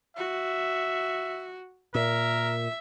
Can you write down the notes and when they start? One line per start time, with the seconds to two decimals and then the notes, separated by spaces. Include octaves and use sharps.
0.17 F#4 E5
1.95 A#2 A#4 E5